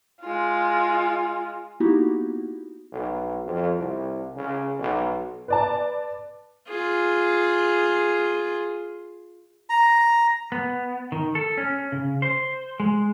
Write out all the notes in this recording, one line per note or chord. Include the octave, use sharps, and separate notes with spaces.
G#3 F4
A#3 B3 D#4 E4 F#4 G4
B1
F2
C2
C#3
B1
B4 D5 A5
F4 G#4
A#5
B3
D#3
A4
C#4
C#3
C5
G#3